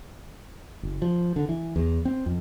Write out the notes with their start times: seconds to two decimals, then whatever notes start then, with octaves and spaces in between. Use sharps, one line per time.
0.83 F#1
1.02 F3
1.36 D3
1.49 E3
1.76 E2
2.05 C4
2.26 F2